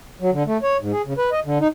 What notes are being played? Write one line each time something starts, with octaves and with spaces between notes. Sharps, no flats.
F#3
D3
A3
C#5
G#2
G#4
C#3
B4
D#5
D3
D#4